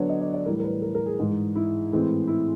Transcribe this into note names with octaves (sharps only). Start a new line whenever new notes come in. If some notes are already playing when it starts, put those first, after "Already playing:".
Already playing: D3 F#3 B3 D4 C#5
D#5
D5
D5
A2 E3 G3 A#4
A#4
B4
A#4
A#4
G#4
G#2 E3 G#3
E4
A2 E3 G#3 C4
E4